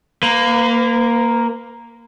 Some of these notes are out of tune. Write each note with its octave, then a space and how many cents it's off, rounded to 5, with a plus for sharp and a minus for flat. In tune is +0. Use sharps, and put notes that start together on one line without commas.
A#3 +0 B4 +40